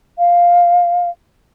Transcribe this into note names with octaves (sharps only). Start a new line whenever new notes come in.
F5